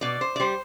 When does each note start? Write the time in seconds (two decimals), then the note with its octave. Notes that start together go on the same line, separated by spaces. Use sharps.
0.01 B2 D5
0.21 C5
0.36 D5
0.40 G3 C5